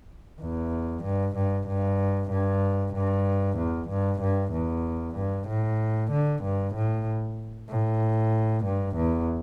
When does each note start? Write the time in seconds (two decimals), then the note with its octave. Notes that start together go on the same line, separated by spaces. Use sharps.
0.41 E2
1.04 G2
1.36 G2
1.68 G2
2.31 G2
2.94 G2
3.57 E2
3.89 G2
4.21 G2
4.52 E2
5.16 G2
5.48 A2
6.11 D3
6.43 G2
6.74 A2
7.69 A2
8.64 G2
8.96 E2